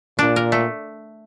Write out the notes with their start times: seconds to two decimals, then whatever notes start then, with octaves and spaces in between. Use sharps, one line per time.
0.19 A#2 D4
0.36 A#4
0.52 A3